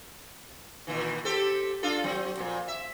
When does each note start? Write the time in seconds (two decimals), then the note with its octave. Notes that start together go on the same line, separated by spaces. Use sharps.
0.87 A#2 D#3 E3
1.25 C4 G4 A4
1.83 D4 F4 A4
2.04 F#3 C4
2.37 F2 A#2
2.68 E5